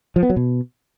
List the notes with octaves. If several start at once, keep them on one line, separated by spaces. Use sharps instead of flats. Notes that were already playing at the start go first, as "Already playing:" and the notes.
F3
B3
F#3
B2